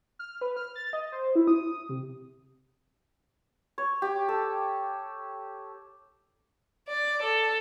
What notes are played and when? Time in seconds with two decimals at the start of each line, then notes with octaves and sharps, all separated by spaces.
0.19 F6
0.41 B4
0.56 F6
0.75 A6
0.93 D#5
1.12 C5
1.35 E4
1.47 D#6
1.89 C3
3.78 C#5
4.02 G4
4.28 A4
6.88 D5
7.22 A4